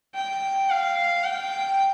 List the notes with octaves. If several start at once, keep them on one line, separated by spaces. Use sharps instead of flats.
G5
F5
G5